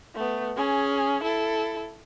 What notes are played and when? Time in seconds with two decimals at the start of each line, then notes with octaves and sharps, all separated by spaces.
0.15 A3 B3
0.57 C#4 G#4
1.23 E4 A4